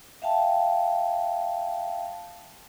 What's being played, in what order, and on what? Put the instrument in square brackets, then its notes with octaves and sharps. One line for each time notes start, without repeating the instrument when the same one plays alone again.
[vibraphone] E5 F5 G5 A5